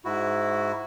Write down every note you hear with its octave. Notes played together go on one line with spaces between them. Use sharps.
G#2 E4 F#4